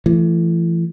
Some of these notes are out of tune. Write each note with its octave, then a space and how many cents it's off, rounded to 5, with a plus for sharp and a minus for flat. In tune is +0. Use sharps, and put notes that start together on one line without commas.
E3 +35 A3 +0